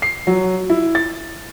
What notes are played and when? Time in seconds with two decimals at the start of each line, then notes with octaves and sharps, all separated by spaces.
0.02 C7
0.27 F#3
0.70 E4
0.95 A6